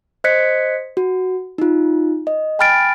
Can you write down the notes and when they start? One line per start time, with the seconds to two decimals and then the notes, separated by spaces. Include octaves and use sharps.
0.24 C5 D#5 F#6 G#6 B6 C#7
0.97 F#4
1.58 D#4 F4
2.27 D#5
2.59 G5 G#5 B5 F6 A6 D7